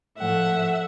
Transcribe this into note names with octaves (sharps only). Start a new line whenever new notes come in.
A2 F3 A3 E5 F#5